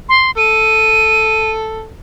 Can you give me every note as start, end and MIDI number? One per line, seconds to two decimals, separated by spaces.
0.09 0.31 84
0.38 1.89 69
0.38 1.50 99